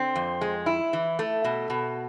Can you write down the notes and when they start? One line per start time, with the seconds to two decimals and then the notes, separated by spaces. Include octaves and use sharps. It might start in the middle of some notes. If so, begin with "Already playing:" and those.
Already playing: D3 C4
0.15 F2
0.41 G#3
0.66 E4
0.93 E3
1.19 A3
1.44 B2
1.70 B2